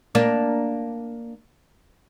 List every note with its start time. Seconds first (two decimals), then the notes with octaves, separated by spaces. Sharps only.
0.15 A#3 D4